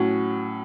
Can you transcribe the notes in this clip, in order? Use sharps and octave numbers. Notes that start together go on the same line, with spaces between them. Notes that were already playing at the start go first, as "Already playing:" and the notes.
Already playing: A2 F#3 C#4 F#4